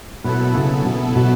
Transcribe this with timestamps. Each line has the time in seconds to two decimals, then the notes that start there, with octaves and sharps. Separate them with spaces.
0.24 B2 F#3 B3 E4 A4
0.55 C#3
0.85 B2
1.15 B2